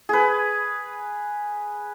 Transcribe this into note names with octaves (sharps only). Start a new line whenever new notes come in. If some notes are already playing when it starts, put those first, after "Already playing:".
G#4 B4